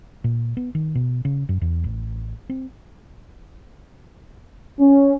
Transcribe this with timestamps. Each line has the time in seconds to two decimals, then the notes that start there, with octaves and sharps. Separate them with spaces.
0.24 A#2
0.57 B3
0.75 D#3
0.95 B2
1.25 C#3
1.49 F#2
1.61 E2
1.84 A1
2.49 C4
4.79 C#4